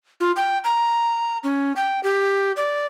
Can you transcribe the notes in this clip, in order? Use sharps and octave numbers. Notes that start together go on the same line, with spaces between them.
F4
G5
A#5
C#4
G5
G4
D5